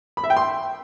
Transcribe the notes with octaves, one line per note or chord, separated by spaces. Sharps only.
B5
E5
G5
C6